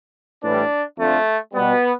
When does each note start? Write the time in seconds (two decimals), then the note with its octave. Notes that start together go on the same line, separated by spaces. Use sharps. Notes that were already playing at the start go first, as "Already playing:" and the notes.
0.43 A2 E3 G3 D4
0.98 F2 D3 F3 A3
1.53 B2 G3 B3